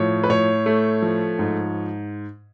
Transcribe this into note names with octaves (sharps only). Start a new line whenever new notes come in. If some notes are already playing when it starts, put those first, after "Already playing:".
Already playing: A2 F3 C#5
B4
A2 C#5
A3
F3
G#2